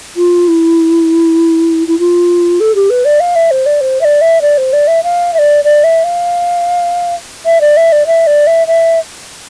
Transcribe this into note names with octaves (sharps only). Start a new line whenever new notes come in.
F4
E4
E4
F4
A4
G4
B4
D5
F5
E5
C5
D5
C5
E5
D5
E5
D5
C5
D5
E5
F5
E5
D5
D5
E5
F5
E5
D5
E5
D5
E5
D5
E5
E5